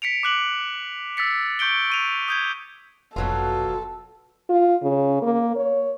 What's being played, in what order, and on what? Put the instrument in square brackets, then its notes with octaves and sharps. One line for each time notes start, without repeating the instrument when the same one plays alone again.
[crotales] B6 C#7 D7 F7
D6 F#6 F#7
E6 A6 B6 C#7
C#6 G6 C#7 D7 G7
C#6 D#7 F7
D#6 G6 G#6
[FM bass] F1 [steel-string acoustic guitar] B2 F#3 F4 [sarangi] A4
[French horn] F4
C#3
A#3
C#5